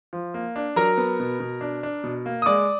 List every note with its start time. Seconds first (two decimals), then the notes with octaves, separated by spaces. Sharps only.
0.13 F3
0.34 A#3
0.56 D4
0.76 F#3 A#4 A#5
0.98 B3
1.20 B2
1.40 B2
1.61 D4
1.83 D4
2.04 B2
2.26 A#3
2.42 D#6
2.46 G#3 D5 D6